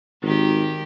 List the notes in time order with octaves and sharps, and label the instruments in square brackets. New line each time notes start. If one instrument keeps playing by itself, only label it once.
[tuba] G#1 [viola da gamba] D#3 G4